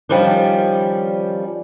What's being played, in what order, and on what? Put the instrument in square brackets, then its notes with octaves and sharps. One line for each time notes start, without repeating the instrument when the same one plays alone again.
[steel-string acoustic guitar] D#3 F3 G3 C#4 D4